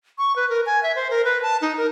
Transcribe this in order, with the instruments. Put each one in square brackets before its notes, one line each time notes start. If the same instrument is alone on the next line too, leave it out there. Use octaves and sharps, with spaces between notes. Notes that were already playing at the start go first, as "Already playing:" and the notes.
[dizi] C#6
B4
A#4
G#5
E5
C5
A#4
B4
A5
D#4
A#4